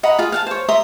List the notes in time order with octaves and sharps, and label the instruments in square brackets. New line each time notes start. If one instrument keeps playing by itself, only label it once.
[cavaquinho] D#5 F#5 A#5 B5
F4 G#4
F5 F#5 A5
C5 C#5
E5 A#5 C6 D#6